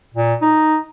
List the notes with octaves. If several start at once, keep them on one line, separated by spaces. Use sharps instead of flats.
A#2
D#4